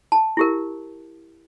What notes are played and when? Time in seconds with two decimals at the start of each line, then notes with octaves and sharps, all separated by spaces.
0.12 A5
0.37 E4 G4 A#4